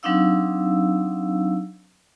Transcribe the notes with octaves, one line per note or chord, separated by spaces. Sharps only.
F#3 C4 D4 D#4 F5 E6